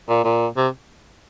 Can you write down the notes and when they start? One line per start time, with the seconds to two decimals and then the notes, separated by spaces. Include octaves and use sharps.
0.09 A#2
0.24 A#2
0.57 C3